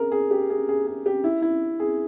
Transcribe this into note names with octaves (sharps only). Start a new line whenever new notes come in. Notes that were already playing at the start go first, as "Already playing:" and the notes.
Already playing: G#4 A#4
G#4
G4
G#4
G#4
G#4
G4
E4
E4
G#4